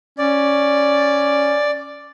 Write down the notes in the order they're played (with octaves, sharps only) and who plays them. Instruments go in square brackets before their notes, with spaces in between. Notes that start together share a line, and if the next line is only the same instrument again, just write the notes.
[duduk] C#4 [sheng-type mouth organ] D5